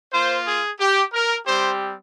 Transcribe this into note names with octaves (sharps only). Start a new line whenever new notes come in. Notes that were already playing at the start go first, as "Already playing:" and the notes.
A#3 F4 C5
G#4
G4
A#4
G3 C4 G4 C5